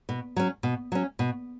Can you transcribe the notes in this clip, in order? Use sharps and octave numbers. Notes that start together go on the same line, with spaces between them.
B2
F#3 C#4
B2
F#3 C#4
B2